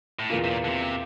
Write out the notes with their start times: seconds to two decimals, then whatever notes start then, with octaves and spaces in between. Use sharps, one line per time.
0.19 A2
0.29 E2 A#2 E3 A#3 F4
0.44 C3
0.50 A#2
0.64 D3
0.69 C3